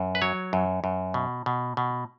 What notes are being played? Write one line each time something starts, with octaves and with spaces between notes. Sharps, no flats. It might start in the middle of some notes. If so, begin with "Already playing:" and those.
Already playing: F#2
B4
F#3 C#5
F#2
F#2
B2
B2
B2